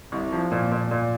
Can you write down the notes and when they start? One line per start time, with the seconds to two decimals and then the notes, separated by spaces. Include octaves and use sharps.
0.12 C2
0.32 F3
0.52 A#2
0.71 A#2
0.91 A#2